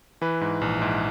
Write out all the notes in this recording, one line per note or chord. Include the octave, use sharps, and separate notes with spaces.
E3 B4
G#2
A#1
G#2